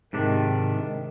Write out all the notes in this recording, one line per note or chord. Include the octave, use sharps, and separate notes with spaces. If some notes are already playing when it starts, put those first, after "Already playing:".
G#2 C3 D#3 D4